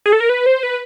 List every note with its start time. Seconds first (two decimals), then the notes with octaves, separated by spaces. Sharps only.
0.06 G#4
0.13 A4
0.20 A#4
0.29 B4
0.46 C5
0.63 B4